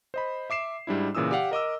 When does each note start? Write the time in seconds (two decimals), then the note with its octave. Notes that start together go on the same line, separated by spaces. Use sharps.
0.14 C5 D#5 B5
0.50 E5 D6 C7 E7
0.87 G#2 G3 D4 E4
1.15 A#2 C#3 E3 D#6 E6
1.31 G4 D5 F5 F#5
1.51 A#4 D#5 D6 E6